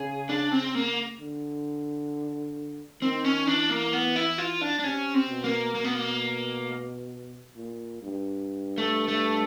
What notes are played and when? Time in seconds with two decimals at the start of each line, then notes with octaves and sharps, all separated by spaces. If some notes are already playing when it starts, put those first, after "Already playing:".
Already playing: C#3 G#4
0.29 D4
0.52 C4
0.75 A#3
1.20 D3
3.02 D#3 C4
3.24 C#4
3.47 E3 D4
3.70 A#3
3.93 B3
4.16 E4
4.38 F4
4.61 D4
4.79 D4
4.84 C3 C#4
5.14 C4
5.29 B2
5.44 A#3
5.75 B2 A#3
5.84 B3
5.95 A#3
7.56 A#2
8.02 G2
8.78 A3
9.08 A3